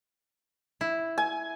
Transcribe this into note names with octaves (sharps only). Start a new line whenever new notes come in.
E4
G#5